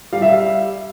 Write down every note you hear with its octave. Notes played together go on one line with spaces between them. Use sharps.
G3 F5
E5
F5